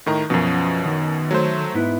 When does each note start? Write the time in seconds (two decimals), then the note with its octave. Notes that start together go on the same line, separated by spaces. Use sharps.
0.06 A2 D#3 A#5
0.30 F#2 B2 F3 C#4 C5
0.85 D#3
1.31 F#3 A3 C5
1.74 G#2 B3 E4